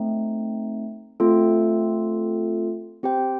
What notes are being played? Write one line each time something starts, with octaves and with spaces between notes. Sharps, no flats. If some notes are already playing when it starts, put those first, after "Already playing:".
Already playing: A3 C4 D#4
A3 C4 F4 A4
C4 G4 C5 G5